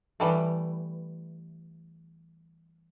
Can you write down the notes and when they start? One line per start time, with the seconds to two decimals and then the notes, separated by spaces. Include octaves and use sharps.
0.20 E3 G3 A3